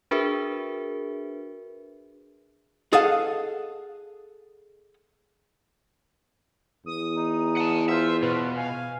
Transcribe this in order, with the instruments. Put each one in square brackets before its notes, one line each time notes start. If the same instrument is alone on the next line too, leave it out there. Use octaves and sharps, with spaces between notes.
[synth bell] D4 F#4 G#4 A#4 B4 E5
[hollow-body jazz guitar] G#4 A4 D#5 F5 F#5
[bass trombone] E2 [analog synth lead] D#6
[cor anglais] D#4
[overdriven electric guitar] F#5 A5
[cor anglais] F4 [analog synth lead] C5 [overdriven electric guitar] E5
[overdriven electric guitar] B2 [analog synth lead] B4
[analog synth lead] F5 [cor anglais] G#5